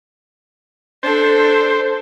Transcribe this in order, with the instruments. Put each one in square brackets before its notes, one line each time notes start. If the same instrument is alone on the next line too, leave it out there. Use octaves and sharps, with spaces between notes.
[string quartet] D4 A4 [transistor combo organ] C5